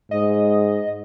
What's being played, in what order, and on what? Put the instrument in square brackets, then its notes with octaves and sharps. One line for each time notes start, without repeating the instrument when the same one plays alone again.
[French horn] G#2 [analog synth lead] D#5